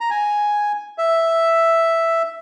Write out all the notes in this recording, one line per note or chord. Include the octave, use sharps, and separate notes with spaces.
A#5
G#5
E5